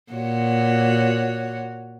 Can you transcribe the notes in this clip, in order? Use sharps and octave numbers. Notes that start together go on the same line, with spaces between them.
A#2 F#4 C#5